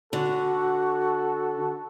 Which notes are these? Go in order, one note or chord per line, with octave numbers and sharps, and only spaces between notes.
D3 F#4 A4